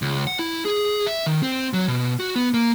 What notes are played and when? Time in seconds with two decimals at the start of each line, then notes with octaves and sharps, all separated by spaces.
0.02 C#2
0.27 F#5
0.39 E4
0.65 G#4
1.07 E5
1.26 D#3
1.43 C4
1.73 F#3
1.88 B2
2.20 F#4
2.36 B3
2.54 A#3